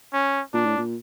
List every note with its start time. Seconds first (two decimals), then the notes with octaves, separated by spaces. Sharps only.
0.13 C#4
0.53 A#2 D4
0.66 A2
0.78 A#2